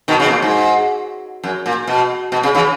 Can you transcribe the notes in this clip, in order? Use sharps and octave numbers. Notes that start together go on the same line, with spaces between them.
B2 D#3
C#3
B2
A#2
G#2
F#2
A#2
B2
B2
C#3
C#3 E3